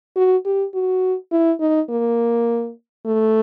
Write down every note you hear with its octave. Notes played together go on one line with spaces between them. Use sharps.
F#4
G4
F#4
E4
D#4
A#3
A3